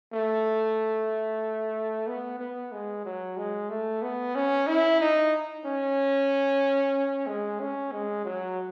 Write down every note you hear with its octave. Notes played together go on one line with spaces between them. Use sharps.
A3
B3
B3
G#3
F#3
G#3
A3
B3
C#4
E4
D#4
C#4
G#3
C#4
G#3
F#3